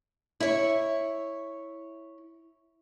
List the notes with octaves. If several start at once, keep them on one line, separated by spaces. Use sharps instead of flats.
E4 C#5